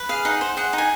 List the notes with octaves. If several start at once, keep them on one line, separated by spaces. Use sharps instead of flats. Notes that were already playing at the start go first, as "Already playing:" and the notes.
Already playing: B4
G#4 F5
D#4 F#5
C5
G#4 F#5
D#4
G#5